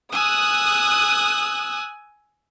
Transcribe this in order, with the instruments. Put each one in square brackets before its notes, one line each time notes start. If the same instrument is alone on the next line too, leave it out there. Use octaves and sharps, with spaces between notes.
[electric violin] G#5 E6 [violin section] D#6 F#6